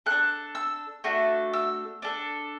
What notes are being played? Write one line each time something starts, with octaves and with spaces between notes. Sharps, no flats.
D4 A4 F#6
E6
A3 D4 F#4 A4
E6
D4 A4